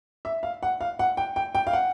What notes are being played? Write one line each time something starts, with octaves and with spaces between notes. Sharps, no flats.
E5
F5
F#5
F5
F#5
G5
G5
G5
F5
F#5